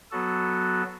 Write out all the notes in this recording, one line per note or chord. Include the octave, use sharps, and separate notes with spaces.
F#3 B3 F#4 A4